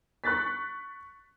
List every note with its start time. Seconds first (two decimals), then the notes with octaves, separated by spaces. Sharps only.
0.24 C#6 F#6 A6 B6